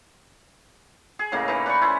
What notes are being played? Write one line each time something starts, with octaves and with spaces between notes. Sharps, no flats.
G#4
A2 C#3 A#3 D#5
E3 D#4
B4 D5 B5 C#6
C#4 E4 C5